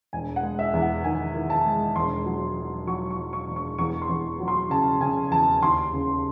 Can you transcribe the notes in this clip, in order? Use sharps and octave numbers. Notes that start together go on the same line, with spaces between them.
E1 G#5
F#5
G#3
E5
E2
F#5
D#3 G#5
D#3
A5
G#3
E1 C6
F#3
F#3
F#3 C#6
C#6
F#3
C#6
E1
C#6
E2 C#6
C6
E2
F#3
C6
C#3 A5
C#3 G#5
E2 A5
D#2 C6
C#3